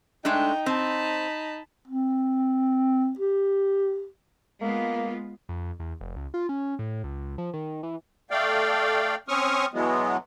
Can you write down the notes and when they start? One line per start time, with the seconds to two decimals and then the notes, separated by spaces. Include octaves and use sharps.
0.25 G#3 A3 D4 D#4 G5
0.66 C4 A5 B5
1.88 C4
3.19 G4
4.62 G#3 A#3 B3 F4
5.49 F2
5.79 E2
6.01 F1
6.16 C#2
6.34 F4
6.49 C#4
6.79 A2
7.04 C#2
7.38 F3
7.53 D#3
7.83 E3
8.31 A3 D5 F5 G5
9.28 C4 C#4 C#6 D#6 F6
9.74 B2 E3 F#3 G#3 B3